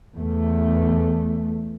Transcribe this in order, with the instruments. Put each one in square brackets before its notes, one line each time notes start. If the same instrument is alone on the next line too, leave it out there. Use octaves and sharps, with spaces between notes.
[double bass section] E2 A3